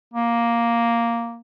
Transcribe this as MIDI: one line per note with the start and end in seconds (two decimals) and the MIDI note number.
0.14 1.40 58